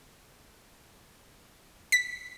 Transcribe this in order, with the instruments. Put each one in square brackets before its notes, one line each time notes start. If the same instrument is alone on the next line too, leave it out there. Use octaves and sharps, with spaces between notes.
[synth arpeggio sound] B6